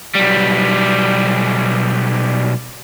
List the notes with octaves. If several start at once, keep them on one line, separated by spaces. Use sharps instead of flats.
B1 G3